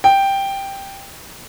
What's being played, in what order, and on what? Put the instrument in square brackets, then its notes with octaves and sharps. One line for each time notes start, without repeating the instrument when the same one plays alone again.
[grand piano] G5